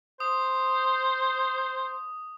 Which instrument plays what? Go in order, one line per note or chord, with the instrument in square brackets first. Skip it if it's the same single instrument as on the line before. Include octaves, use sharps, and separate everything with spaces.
[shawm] C5 [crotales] D#6